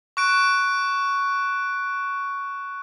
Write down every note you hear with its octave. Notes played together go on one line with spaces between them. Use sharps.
C#6 F#6 D7